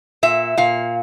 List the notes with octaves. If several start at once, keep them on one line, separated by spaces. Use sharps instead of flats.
A#2 E5
A#2 F5